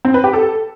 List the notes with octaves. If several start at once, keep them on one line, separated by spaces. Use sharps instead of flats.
C4
B4
G4
A4